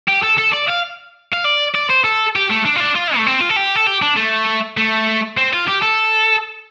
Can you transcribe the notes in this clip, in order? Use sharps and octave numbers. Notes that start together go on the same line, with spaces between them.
G4
A4
A4
D5
F5
F5
D5
D5
C5
A4
G4
A3
D4
F4
D4
F4
A3
C4
F4
A4
G4
A4
G4
D4
A3
A3
C4
F4
G4
A4